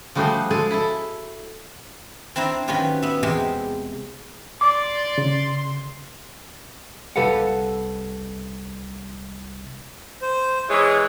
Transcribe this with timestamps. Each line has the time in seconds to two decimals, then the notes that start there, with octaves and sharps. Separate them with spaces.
0.15 F3 G3 A3 F#4 G#4 C5
0.50 G#3 G#4 A4 G#5
0.71 E4 A4
2.36 C4 D4 E4 C5 A#5
2.68 D#3 F#3 C#4 F4 G4 B4
3.02 B3 E5
3.23 E2 C3 G#3 G4 C5
4.61 D5 C6 D6
5.18 C#3
7.16 C2 G4 A4 B4 F5 F#5
10.22 C5
10.69 E3 G#3 G#4 C#5